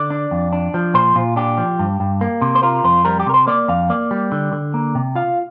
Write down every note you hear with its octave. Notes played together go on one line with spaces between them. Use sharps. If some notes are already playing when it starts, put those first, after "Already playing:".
Already playing: D3 D5
D4
F2
D4
F3
A#2 C5
A#2 F4
D4 G4
F3
G2
G2
A#3
C3
C5
F4 A#4
F2 C5
G3 A#4
G4
C3 A#4
C5
A#3 D5
F2 F5
A#3 D5
G3
D3
D3
A#3
C3
F4 F5